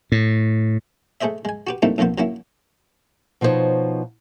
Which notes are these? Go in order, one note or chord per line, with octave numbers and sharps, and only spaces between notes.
A2
A3 G#4 C5 D#5 E5
G#3 G#5
F#4 G4 B4
G3 A3 A#3 C4 D#4 E4
B1 F2 A#3 B3 C5
F#3 A#3 C#4 E4
B2 F3 D#4 E4 C5 C#5